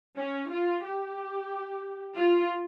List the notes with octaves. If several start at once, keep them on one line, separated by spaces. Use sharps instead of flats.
C#4
F4
G4
F4